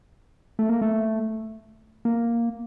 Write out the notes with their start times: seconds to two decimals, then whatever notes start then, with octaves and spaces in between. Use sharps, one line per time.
0.59 A3
0.69 A#3
0.82 A3
2.05 A#3